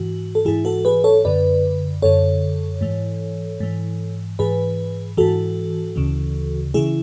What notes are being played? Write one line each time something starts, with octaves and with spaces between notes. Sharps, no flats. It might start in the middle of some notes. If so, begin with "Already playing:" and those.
Already playing: G#2 E3 F#4
A4
G#2 E3 E4 G#4
F#4 A4
G#4 B4
A4 C#5
F#2 D3 B4 D5
F#2 D3 A4 C#5
G#2 E3
G#2 E3
G#2 E3 G#4 B4
G#2 E3 F#4 A4
D2 C#3 E3
C#3 E3 E4 G#4